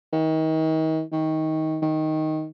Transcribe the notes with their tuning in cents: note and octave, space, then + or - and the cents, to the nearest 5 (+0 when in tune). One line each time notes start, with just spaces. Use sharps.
D#3 +35
D#3 +20
D#3 +5